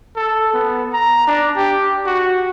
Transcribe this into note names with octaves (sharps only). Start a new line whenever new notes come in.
A4
B3
A#5
D4
G4
F#4